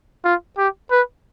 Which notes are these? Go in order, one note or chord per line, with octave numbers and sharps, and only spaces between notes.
F4
G4
B4